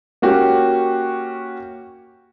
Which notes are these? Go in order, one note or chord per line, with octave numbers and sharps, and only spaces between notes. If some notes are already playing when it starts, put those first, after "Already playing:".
A#3 C#4 F#4 G4